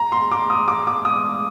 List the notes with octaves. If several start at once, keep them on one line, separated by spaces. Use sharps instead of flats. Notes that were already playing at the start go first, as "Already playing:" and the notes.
Already playing: A#5
C6
D6
D#6
D6
D6
D#6